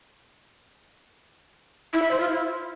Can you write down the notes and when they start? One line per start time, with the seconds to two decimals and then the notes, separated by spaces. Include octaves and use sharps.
1.93 E4
2.02 E5
2.11 C5
2.20 F4
2.29 E4